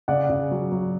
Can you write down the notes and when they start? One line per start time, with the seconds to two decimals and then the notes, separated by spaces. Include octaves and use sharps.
0.08 C#3 D5 F#5
0.30 C#3
0.51 F#3
0.72 F#3